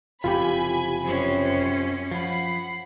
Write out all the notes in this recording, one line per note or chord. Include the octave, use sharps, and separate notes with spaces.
F#1 F2 C3 F4 G4 G#5 B5
F#2 C4 C#4
F3 F#5 B5 C7